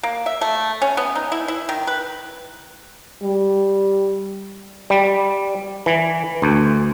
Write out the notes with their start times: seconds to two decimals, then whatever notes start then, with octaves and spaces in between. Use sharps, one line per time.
0.03 A#3
0.26 E5
0.41 A3
0.82 C#4
0.97 B3
1.15 D#4
1.32 E4
1.48 E4
1.69 D#3
1.87 B4
3.23 G3
4.90 G3
5.86 E3
6.42 D2